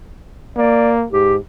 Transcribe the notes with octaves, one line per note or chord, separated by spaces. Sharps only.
A#3 D5
G#2 G4